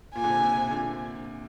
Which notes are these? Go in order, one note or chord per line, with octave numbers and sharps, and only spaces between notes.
A#2 G#5
D3
C3
C3
C3
A#2 D3